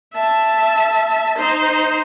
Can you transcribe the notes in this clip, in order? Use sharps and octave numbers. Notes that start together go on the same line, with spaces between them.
E5 A5
D#4 C5